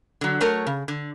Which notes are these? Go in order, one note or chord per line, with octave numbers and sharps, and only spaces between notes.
D3 F#3
F#3 A3 A#4 C#5
C#3
D3